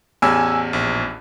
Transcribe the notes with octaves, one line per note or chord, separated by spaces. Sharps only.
A1 E2 G#5 E6
A#1